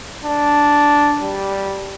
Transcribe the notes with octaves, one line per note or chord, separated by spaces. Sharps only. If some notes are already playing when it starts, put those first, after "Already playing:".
D4
G3